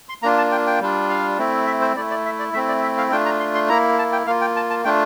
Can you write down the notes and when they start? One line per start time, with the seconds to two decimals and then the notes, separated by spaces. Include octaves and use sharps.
0.09 C6
0.22 A#3 D4 F4 A#5
0.38 A5
0.52 G5
0.67 G5
0.80 G3 D4 F4
1.10 F5
1.38 A3 C4 E4
1.67 E5
1.81 C5
1.96 A3 E4 D5
2.10 D5
2.25 E5
2.39 D5
2.53 A3 C4 E4 E5
2.68 D5
2.83 E5
2.98 F5
3.11 A3 D4 F4 G5
3.25 A#5
3.40 C6
3.55 C6
3.69 A#3 E4 A#5
3.99 A5
4.12 G5
4.27 A#3 F4 F5
4.41 G5
4.56 A5
4.70 A5
4.84 A3 D4 F4 G5